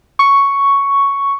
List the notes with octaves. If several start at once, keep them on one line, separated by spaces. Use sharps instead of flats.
C#6